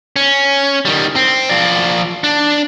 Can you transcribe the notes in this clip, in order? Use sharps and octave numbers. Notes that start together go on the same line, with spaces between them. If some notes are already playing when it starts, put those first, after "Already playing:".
C#4
D#3 G3
C4
F3 D5
D4